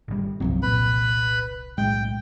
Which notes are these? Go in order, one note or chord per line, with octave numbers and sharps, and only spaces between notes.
G#1 C3 G3
E1 C2 G2 F3 F#3 C4
A#2 B4 B5
B1 A2 G#3 G5